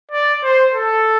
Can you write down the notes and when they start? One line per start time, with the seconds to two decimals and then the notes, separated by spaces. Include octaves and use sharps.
0.12 D5
0.43 C5
0.75 A4